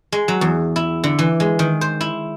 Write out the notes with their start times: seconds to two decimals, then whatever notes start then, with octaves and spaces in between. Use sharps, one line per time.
0.12 G#3
0.28 F#3
0.41 E2
0.76 E4
1.04 D3
1.19 E3
1.40 G#3
1.59 D#3
1.81 C5
2.01 E4